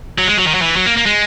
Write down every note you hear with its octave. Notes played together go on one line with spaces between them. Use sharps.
F#3
G#3
F#3
D#3
F#3
E3
F#3
A#3
A#3
G#3